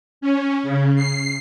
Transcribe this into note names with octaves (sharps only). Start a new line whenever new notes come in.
C#4
C#3
C7